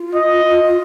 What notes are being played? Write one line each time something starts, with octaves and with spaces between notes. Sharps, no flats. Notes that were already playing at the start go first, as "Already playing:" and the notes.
Already playing: F4
D#5